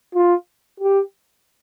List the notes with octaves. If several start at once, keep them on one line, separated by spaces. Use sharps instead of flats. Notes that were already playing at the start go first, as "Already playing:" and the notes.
F4
G4